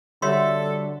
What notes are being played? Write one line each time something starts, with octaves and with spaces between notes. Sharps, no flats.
D3 G3 F#4 A4 C#5 E5 C6